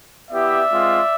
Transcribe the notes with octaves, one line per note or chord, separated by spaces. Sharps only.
B3 E4 G4 D5 E5
G#3 C4 F4